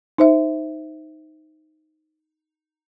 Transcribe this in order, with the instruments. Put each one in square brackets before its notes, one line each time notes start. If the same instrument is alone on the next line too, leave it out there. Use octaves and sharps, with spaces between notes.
[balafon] D#4 C5 E5